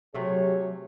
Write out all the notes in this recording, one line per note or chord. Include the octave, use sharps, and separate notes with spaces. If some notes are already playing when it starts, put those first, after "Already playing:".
C3 F#3 A3 G4 G#4 C#5